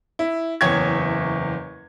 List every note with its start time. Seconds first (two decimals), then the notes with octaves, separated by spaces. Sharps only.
0.19 E4
0.61 F#1 E2 C#5 G5 C#6 G#6